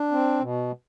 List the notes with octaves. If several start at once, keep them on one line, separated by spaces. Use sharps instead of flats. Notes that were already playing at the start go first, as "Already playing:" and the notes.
Already playing: D4
C4
B2